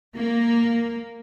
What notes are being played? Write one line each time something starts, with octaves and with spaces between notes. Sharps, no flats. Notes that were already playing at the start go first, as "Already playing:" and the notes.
A#3